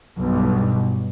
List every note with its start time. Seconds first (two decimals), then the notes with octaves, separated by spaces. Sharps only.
0.18 B1 G2 B2